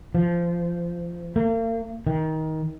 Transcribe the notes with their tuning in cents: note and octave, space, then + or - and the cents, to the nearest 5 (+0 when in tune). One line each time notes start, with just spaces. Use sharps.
F3 -20
A#3 -40
D#3 +20